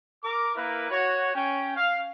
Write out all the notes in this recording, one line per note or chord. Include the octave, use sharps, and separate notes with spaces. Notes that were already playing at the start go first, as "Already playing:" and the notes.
A#4 D6
A#3 E4 A#4 B4
F#4 C#5
C#4 G5
F5